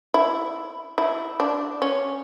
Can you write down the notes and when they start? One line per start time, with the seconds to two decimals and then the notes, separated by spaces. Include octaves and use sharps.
0.14 E4
0.98 E4
1.40 D4
1.82 C#4